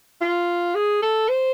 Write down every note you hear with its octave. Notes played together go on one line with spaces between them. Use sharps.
F4
G#4
A4
C5